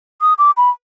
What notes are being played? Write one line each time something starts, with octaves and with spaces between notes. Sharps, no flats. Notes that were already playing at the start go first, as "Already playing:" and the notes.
D#6
D6
B5